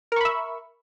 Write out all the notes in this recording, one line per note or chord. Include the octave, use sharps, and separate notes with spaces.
A#4 E5 B5 C#6